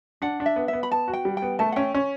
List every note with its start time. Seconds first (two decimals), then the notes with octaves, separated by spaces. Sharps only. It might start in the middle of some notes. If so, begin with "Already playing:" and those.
0.22 D4 F#5
0.40 D4
0.46 E5
0.56 B3
0.68 E5
0.73 B3
0.83 B5
0.91 B3 A5
1.08 F#4
1.13 G5
1.25 G3
1.37 G5
1.42 B3
1.59 A3 A5
1.72 F#5
1.76 C#4 G5
1.94 C#4